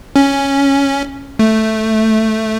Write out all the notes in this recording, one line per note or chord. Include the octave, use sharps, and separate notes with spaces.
C#4
A3